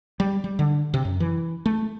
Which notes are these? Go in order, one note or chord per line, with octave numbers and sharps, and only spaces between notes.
G3
G3
D3
C3
F#2
E3
A3